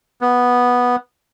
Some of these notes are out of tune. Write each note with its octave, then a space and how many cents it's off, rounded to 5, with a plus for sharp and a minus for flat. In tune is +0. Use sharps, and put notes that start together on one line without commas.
B3 -5